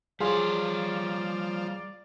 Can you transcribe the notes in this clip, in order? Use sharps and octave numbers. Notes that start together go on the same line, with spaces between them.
F3 G3 G#4 C#5 D5 F5 C6